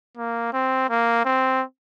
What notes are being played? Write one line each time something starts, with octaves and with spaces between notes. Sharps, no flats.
A#3
C4
A#3
C4